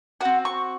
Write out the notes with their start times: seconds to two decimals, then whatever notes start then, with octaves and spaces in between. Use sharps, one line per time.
0.21 C4 F#4 F#5
0.45 C#6